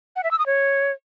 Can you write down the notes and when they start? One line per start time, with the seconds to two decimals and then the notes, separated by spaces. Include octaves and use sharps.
0.16 F#5
0.24 E5
0.31 E6
0.39 D#6
0.46 C#5